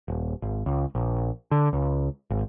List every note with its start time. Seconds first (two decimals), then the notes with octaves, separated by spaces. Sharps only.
0.08 D#1
0.42 G#1
0.66 C#2
0.95 A#1
1.51 D3
1.73 C#2
2.30 G#1